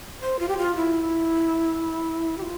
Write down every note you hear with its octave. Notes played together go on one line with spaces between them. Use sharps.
C5
F4
G4
F4
E4
G4
F4